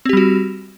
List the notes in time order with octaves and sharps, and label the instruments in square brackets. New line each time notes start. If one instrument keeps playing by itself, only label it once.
[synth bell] C4
G4
G3
F#4